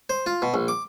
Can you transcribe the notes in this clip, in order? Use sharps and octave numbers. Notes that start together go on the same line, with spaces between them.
C5
F4
B2
A#1
D6